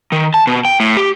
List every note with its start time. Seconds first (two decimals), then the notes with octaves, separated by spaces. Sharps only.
0.12 D#3
0.34 A5
0.47 B2
0.65 G5
0.80 A2
0.97 G4